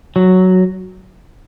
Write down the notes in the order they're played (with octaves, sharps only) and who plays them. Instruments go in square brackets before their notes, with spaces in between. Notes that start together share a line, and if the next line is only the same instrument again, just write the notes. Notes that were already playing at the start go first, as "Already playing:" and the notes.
[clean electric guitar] F#3